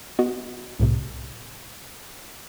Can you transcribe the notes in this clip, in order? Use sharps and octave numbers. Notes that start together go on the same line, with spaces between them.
B3 F#4 D#5
C2 A2 C3